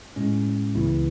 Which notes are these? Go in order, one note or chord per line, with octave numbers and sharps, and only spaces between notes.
A2 G#3 C#4
C#2 C#3 E3 B3 E4